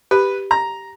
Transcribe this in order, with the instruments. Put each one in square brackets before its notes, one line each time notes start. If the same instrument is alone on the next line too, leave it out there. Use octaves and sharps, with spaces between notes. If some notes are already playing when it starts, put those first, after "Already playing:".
[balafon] G4 [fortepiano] B4
[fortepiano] A#5